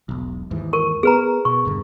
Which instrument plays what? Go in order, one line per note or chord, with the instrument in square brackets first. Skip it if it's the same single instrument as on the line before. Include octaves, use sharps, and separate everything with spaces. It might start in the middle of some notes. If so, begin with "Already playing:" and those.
[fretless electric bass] E1 B1
D#2 G#2 E3
[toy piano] A#4 C#6
[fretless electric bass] B3 [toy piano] G#4 B4 A#5
[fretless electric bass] B2 [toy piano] C#6
[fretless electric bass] E1 G2 D3